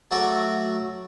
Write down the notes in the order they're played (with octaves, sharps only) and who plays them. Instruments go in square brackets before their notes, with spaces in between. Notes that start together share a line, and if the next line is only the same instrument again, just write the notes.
[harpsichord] F#3 A3 F#4 A4 D5